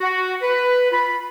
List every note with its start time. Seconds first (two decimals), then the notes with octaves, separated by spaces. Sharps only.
0.01 F#4
0.42 B4
0.91 F4 B5